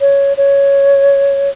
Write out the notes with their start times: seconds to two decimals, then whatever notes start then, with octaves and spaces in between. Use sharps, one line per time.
0.01 C#5
0.37 C#5